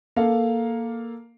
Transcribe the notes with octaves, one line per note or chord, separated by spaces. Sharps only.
A#3 A4 F5